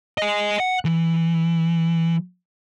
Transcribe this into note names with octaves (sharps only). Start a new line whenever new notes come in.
D#5 G#5
F#5
E3